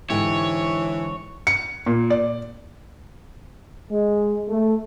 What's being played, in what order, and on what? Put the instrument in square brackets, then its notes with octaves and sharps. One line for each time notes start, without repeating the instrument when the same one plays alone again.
[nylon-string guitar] G#2 D3 G4 [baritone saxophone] E3 [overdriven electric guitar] C#5
[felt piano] C#7
A#2
D5
[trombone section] G#3
A3